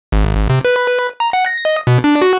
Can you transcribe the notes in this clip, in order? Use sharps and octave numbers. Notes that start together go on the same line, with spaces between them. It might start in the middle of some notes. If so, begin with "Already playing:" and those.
G#1
C3
B4
A#5
F#5
A#6
D#5
B2
D4
F#4